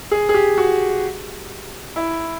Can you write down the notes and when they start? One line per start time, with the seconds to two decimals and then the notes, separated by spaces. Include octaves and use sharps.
0.11 G#4
0.29 G#4
0.34 G4
0.58 F#4
1.96 E4